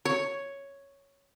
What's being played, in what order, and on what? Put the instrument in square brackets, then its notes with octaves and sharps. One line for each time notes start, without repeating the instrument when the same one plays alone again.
[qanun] C#5